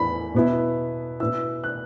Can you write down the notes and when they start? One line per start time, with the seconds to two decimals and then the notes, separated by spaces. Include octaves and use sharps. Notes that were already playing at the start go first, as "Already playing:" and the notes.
Already playing: E2 E3 B5
0.34 B2 B3 E4
1.20 B2 B3 E4 E6
1.64 F#6